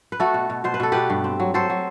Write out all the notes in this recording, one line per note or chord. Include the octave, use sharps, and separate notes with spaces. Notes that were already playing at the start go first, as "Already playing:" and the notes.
B4
A3 F#4 A4
B2
B2
B2 C5
B4
B2 A4
B2 G4 B4
G2
C4
F#3
F#3 A4 C5
F#3